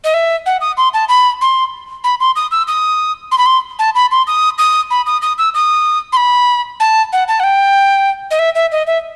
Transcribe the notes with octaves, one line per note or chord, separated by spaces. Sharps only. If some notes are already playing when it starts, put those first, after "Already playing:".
D#5
E5
F#5
D#6
C6
A5
B5
C6
B5
C6
D#6
E6
D#6
C6
B5
C6
A5
B5
C6
D#6
D#6
B5
D#6
D#6
E6
D#6
C6
B5
A5
F#5
A5
F#5
G5
D#5
E5
E5
D#5
E5